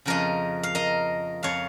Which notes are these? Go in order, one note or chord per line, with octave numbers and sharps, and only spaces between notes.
F2 C#3 F3 A#4 D#5
F5
A#4 D#5
F2 F3 C#5 F5